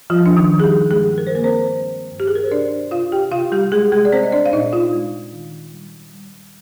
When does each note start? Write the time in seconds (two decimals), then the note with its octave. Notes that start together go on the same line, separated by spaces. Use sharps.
0.10 F3 G3 F4
0.26 D4
0.36 D#3 D#4
0.50 G3
0.60 G#4
0.64 G3 G4
0.91 G2 G#3 G#4
1.18 A#4
1.27 C5
1.31 D#3 A#3 A#4
1.44 C4 C5
1.71 G#3
2.11 G2
2.20 G4
2.28 G#4
2.35 A#4
2.44 C5
2.51 C3 D4 D5
2.91 C3 F4 F5
3.12 G4 G5
3.32 C3 F4 F5
3.52 G3 G4
3.72 C3 G#3 G#4
3.92 G#3 G#4
4.05 D5
4.12 G#3 C4 C5
4.23 D#5
4.32 D4 D5
4.46 F5
4.53 A#2 D#4 D#5
4.73 F4 F5
4.93 G#3
5.33 D#3
5.73 G3
6.14 G3